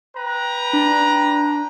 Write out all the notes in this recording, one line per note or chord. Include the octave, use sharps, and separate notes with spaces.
B4 G5 A#5
D4